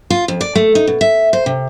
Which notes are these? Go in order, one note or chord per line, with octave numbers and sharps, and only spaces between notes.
F4
F2
D5
A3
D#4
B2
E5
C5
C3